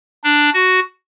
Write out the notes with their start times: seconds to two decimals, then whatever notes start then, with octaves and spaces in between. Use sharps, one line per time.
0.24 D4
0.54 F#4